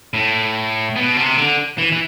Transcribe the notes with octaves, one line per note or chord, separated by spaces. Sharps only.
A2
B2
C3
D3
E3
E3